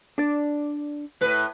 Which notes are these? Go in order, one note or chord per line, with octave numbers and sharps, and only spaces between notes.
D4 D5
A2 B4